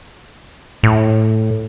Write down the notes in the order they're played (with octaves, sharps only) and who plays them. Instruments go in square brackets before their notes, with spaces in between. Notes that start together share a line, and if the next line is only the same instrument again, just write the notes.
[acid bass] A2